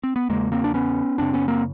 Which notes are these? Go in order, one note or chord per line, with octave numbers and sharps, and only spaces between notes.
C4
B3
E2 C#3 G#3 A#3
A#3 C4
D4
B3 C#4
F#2 C#3 C4 D4
B3 C#4
A#3 C4